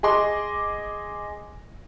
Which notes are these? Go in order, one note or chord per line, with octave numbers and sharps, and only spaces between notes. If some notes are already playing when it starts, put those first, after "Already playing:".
G#4 D#5 C6 D6